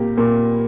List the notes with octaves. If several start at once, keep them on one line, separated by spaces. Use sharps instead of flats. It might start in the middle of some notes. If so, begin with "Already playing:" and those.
Already playing: A#2 A#3 G4
A#2